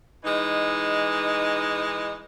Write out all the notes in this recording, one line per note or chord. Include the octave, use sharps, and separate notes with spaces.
E3 G#3 D#4